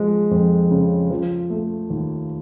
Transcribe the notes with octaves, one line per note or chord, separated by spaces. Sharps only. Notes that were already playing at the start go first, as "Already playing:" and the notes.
Already playing: F3 G#3
F2
C#3
F3
A3
D#2